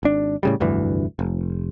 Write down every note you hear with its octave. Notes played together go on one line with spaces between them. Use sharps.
G#1 D4
A2 C#3 G3
F1 D2 G2 E3
F1